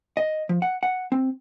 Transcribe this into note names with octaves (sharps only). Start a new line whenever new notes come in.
D#5
F3
F#5
F#5
C4